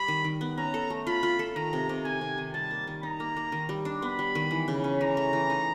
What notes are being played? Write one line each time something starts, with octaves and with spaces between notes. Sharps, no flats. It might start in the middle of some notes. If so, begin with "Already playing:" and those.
Already playing: G3 B5
D#3
D#3
B3
C#4 A#5
A4
A3
F4 B5
F4
A4
D#3 A#5
C3
C3
D#3 G#5
C3
D#3
G3 A5
A#3
D#3
D#4 A#5
A#3
A#3
D#3
G3
D4
B3 B5
G3
D#3
E3
C#3
C#4
E3 A#5
A3
E3
D#4